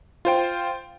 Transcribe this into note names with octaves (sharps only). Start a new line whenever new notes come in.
F4 C5 G5